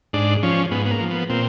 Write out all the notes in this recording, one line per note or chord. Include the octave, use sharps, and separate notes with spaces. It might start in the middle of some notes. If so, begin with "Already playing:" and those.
G#2 D4
F3 C#4
G#2 B3
B3
A#3
F3
B3
A#2 C4